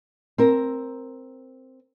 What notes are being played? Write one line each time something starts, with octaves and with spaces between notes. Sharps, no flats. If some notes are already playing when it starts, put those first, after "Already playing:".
C4 A#4